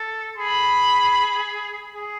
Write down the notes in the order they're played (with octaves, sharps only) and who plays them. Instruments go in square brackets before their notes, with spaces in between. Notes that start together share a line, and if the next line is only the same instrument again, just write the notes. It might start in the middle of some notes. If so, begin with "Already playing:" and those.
Already playing: [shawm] A4
[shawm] G#4 [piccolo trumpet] B5
[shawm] G#4